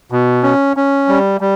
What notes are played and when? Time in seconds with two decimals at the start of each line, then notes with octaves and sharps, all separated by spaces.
0.11 B2
0.43 C#4
0.77 C#4
1.08 G3
1.41 G3